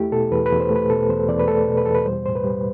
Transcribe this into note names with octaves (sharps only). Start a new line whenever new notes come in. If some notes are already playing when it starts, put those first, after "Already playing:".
Already playing: E2 A3 E4 G4
B2 A4
E2 B4
B4
E2
C5
A3
B4
B2 A4
E2 C5
E2 D5
B4
A3 A4
B2
B4
E2 A4
B4
G3 C5
A2 C5
B4
G3